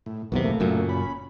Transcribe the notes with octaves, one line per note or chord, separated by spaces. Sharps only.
A2
B1 E2 C3 D#3 B3
A2 A3 A#3
F#1 F#2 A#2
C#4 B5